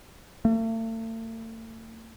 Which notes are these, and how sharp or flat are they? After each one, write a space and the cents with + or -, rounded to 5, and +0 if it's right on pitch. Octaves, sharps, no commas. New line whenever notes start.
A3 +40